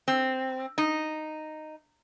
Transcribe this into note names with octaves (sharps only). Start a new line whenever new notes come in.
C4
D#4